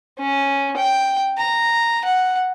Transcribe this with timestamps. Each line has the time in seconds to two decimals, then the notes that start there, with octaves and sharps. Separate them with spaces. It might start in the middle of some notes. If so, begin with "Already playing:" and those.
0.19 C#4
0.76 G5
1.38 A#5
2.05 F#5